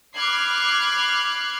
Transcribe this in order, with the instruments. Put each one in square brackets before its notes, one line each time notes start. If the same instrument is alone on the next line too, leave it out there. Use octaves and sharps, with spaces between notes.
[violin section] B5 D6 F6 F#6 G#6 C7